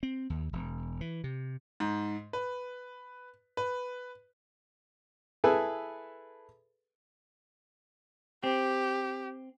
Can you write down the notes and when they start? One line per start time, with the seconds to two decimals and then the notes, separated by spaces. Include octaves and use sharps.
0.03 C4
0.30 D#2
0.53 E1
1.01 E3
1.24 C3
1.80 G#2
2.33 B4
3.57 B4
5.44 E4 G#4 A4 B4
8.44 C4 G4